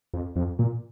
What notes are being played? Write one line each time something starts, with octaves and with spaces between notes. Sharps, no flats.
F2
F2
A#2